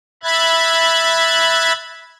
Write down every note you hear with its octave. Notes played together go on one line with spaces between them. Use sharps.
E5 B5 F#6 G#6 A6